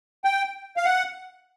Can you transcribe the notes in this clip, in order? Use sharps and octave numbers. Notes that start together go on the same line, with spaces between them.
G5
F5
F#5